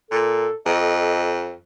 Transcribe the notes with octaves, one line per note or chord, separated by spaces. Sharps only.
A#2 A4
F2 A4 D#5